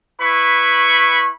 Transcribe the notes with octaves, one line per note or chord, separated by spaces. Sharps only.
E4 B4 B5 C#6